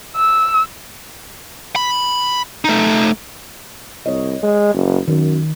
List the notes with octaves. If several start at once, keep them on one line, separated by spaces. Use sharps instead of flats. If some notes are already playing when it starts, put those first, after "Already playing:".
E6
B5
A3 D#4
C2 C#5 D#5
G#3
F#1
F#2 D#3